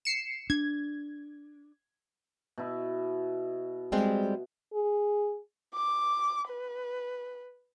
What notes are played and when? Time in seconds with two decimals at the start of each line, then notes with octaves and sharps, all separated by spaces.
0.05 C7 C#7 E7
0.50 D4 G#6
2.58 B2 E4
3.92 G3 G#3 C4
4.74 G#4
5.74 D6
6.49 B4